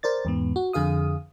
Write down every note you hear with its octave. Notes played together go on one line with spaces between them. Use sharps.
A#4 C5 D5 A6
E2 G#2 B3
F#4
F2 D3 G#4 F5 D#6